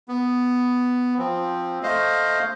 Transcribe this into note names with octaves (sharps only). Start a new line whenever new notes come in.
B3
F3 C4
A3 C5 D#5 F5